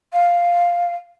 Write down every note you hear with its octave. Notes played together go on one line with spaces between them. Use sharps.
F5